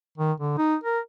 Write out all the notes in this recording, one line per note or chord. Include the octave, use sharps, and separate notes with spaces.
D#3
D3
D#4
A#4